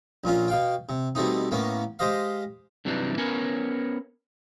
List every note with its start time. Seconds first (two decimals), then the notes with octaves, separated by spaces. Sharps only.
0.24 A#1 A#2 C#4 F4
0.48 B2 F5 G5
0.89 C3
1.15 B2 G3 A3 C4 D#4
1.51 A2 A#3 B3 C#4
1.99 G#3 G4 C5 D#5 F5
2.85 G2 C3 E3 F#3 D4 D#4
3.18 B3 C#4 A#4 C#5 G#5